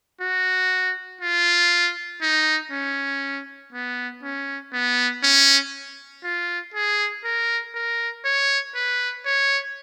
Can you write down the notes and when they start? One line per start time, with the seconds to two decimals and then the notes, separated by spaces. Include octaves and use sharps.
0.21 F#4
1.21 F4
2.22 D#4
2.72 C#4
3.73 B3
4.23 C#4
4.73 B3
5.23 C#4
6.24 F4
6.74 G#4
7.25 A#4
7.75 A#4
8.25 C#5
8.75 B4
9.26 C#5